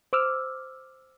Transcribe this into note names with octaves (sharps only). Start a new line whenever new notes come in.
C5 D6 E6 F6